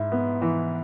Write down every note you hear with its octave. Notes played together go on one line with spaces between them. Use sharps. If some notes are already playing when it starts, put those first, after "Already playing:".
Already playing: G#2 E4
B3
E3